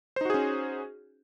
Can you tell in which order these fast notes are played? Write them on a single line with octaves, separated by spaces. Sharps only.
C5 D#4 F#4 G#4 C#4